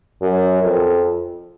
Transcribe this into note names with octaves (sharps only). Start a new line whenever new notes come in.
F#2
F2